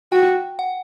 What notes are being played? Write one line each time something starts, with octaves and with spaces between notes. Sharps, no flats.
F#4 G5
F#5